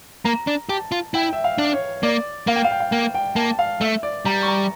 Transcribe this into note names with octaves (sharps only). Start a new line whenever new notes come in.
A#3 A#5
D4
G4 A5
F4
E4 G5
E5
F5
D4
C#5
A#3 D5
A#3 F5
G5
F5
G5
F5
A#3 G5
G5
A#3 A5
F5
A3 E5
D5
G3 A#5
C#6
A#5